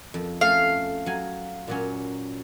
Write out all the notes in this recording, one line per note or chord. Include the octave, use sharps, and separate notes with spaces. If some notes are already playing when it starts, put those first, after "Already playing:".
F2
A3 C#4 A4 F5
F#3 G#5
A#2 F#3 C#4